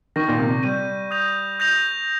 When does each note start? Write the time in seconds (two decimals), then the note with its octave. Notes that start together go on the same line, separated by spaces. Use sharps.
0.16 D#3 C#6 G6 A#6 D#7
0.28 A#2
0.39 C3
0.63 G3 C#6 G6 A#6 D#7
1.11 D#6 G6 A#6 F7
1.59 D#6 G6 A#6 F7